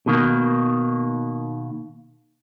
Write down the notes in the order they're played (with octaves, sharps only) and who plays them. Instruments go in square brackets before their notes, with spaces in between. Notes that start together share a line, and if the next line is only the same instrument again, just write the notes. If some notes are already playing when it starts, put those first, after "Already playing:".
[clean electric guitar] B2 D#3 A#3